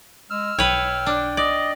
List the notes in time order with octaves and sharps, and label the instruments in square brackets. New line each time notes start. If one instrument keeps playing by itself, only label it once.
[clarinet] G#3 [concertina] E6 F6
[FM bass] B1 [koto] B4 C#5 [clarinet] G5
[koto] D4
[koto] D5 [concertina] D#5